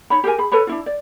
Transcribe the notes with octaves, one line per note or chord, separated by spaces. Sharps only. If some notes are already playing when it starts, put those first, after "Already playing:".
D#4 C#5 B5
G4 G#4 A#4 G#5
G#4 B5
A4 B4 C#5 B5
D4 E4 F4
D5